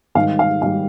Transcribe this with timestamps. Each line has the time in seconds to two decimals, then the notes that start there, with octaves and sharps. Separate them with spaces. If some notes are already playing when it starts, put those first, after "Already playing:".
0.15 G#2 D#3 G3 F5
0.39 F5
0.62 G#2 D#3 G3 F5